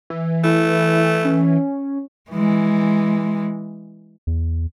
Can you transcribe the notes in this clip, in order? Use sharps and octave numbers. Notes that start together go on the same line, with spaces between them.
E3
A3 E4
C#4
E3 G#3
E2